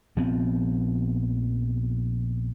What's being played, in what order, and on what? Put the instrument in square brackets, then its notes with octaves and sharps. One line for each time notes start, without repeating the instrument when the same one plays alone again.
[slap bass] A#1 F3 B3 C4